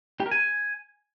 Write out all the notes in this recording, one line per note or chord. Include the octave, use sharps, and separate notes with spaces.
G4
A#4
G#5